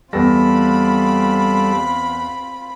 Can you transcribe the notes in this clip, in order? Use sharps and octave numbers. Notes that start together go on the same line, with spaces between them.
E2 G3 C4 F4 A4 B4 B5 A#6